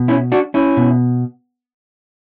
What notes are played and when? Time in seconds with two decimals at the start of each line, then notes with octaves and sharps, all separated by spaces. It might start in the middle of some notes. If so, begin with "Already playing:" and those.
Already playing: B2
0.08 C#4 E4
0.32 D4 F#4
0.54 C#4 E4
0.77 B2